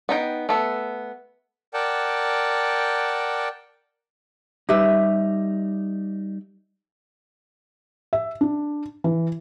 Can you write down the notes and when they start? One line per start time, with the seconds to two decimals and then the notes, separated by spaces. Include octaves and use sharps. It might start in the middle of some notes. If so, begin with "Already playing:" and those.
0.09 B3 D#4 G5
0.49 A3 B3
1.74 A#4 D5 F#5 G5 A5
4.69 G3 D#4 G4 B4 E5
8.13 E5
8.41 D4
9.04 E3